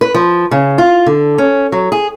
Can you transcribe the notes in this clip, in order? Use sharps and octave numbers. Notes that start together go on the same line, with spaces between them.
B4
F3
C#3
F4
D3
C#4
F#3
G#4